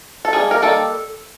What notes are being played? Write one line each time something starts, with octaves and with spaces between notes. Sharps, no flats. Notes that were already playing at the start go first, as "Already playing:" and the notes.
A4
D#3 G3 A#3 G#4
A#4
D#3 G3 A#3 A4